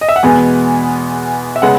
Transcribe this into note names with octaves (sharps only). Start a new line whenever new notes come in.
D#5
E5
F#5
E2 B2 G#3 B3 G#5
E5
C#3 G#3 B3 F#5